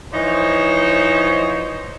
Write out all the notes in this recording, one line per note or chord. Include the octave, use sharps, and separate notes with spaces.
E3 F3 D#4 C5 C#5